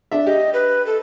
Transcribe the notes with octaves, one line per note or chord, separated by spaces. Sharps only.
D4 E5
G4 D#5
B4
A4